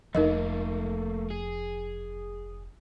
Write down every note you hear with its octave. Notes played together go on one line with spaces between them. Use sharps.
F1 F2 F3 A3 A#3 D#4 A#4 D#5
G#4